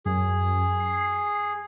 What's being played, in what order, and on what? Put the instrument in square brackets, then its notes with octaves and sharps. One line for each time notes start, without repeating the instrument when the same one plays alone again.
[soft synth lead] F#2 [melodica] G#4
[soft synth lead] C7